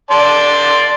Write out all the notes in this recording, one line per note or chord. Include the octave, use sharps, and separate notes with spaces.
D5 A5 C6